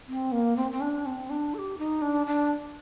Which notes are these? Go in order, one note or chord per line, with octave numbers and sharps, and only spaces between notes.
C4
A#3
C4
C4
D4
C4
D4
A4
G4
D#4
D4
D4